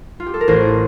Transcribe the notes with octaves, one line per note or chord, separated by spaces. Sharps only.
F4
G4
A4
A#4
A1 C5